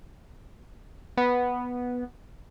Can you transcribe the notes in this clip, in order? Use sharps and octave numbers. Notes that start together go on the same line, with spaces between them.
B3